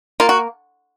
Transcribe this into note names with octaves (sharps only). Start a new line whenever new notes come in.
A#3 F4
F#4